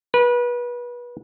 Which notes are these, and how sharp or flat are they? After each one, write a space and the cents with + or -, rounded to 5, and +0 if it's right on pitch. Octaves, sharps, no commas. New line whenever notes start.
B4 -30